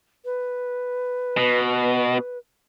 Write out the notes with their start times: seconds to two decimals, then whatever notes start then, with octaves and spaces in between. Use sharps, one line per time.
0.25 B4
1.37 B2